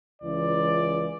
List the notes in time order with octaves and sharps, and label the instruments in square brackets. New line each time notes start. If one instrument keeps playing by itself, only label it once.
[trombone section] C#2 E3 [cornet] D5